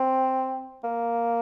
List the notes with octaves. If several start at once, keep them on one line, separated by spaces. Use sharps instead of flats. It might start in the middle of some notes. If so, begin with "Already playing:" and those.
Already playing: C4
A#3